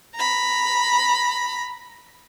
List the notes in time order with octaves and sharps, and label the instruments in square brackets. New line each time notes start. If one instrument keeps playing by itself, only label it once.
[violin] A#5 B5